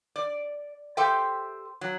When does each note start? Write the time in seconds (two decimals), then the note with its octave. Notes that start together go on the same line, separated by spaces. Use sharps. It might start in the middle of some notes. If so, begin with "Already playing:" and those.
0.16 D5
0.97 G4 A4 C5 E5 G5
1.81 F#3